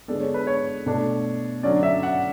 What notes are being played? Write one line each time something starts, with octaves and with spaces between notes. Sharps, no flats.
D3 G#3 B3 D4 A4
C#5
B4
C#5
B2 A3 D4
D3 F#3 C#4 D5
E5
F#5